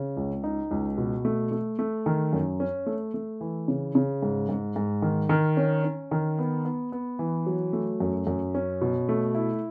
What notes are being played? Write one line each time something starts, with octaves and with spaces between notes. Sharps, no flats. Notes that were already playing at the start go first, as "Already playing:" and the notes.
Already playing: C#3
C#2
D#4
C#2
B2
A3
A3
A3
D#3
F#2
C#4
A3
A3
E3
C#3
C#3
G#2
G#2
G#2
D#3
D#3
C#4
C#4
D#3
B3
B3
B3
E3
F#3
A3
F#2
F#2
C#4
B2
A3
E4